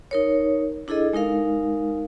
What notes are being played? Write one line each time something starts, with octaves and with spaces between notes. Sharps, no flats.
D#4 A#4 C#5
D4 E4 G#4 A4 D#5
G#3 D#4 A#4 F5